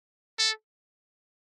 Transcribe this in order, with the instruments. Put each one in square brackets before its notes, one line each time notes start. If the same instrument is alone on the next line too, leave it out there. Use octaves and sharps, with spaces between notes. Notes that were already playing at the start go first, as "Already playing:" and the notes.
[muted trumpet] A4